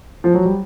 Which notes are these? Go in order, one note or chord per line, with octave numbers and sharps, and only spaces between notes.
F3
F#3
G3